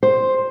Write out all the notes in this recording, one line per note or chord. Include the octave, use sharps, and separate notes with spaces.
C5